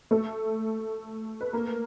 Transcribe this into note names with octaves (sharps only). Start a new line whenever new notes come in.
A3 A4
B4
A#3 A#4